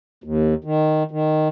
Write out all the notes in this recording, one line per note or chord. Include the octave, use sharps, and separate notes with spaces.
D#2
D#3
D#3